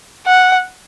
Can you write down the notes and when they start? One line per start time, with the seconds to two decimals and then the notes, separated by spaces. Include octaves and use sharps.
0.26 F#5